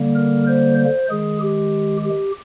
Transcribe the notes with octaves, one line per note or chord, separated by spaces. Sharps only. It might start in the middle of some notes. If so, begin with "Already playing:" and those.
Already playing: D3 G3 A#3
A#4
C5
C5
D#3 G#3 G#4
G4
G4